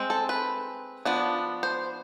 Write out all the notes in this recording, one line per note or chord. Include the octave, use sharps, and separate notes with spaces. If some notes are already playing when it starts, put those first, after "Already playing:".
Already playing: G#3 C4
A4
B4
F3 B3 D4
C5